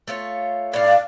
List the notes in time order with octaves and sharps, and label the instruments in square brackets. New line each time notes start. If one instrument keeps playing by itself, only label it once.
[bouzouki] A3 F4 C#5
[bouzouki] A2 F5 [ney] D5